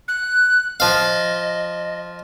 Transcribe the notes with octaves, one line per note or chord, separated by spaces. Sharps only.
F#6
F3 D#5 F5